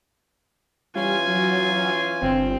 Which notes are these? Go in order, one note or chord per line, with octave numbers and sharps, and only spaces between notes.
E3 G3 C#4 F4 G#5
F#3
G1 C4